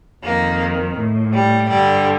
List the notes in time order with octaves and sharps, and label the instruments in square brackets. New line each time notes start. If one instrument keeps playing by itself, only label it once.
[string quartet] F2 D#3 A#3
A2
G3
G2 D3 G3